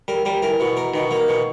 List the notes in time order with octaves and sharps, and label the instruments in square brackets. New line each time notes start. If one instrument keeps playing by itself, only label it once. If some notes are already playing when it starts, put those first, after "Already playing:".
[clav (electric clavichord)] G3 [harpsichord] A#4
[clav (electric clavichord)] G3 [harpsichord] A#4
[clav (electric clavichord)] E3 [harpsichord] A#4
[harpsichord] B2
A#4
[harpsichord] B2 [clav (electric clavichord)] D#3
[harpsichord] A#3
B2